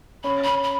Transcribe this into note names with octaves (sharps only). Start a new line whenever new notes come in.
C#4 B5
C#4 B5
B5